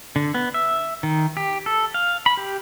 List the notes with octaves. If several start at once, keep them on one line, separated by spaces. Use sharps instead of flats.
D3
B3
E5
D#3
G4
A4
F5
B5
G4